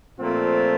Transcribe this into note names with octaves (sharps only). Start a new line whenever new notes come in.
A#2 F3 A3 C4 F4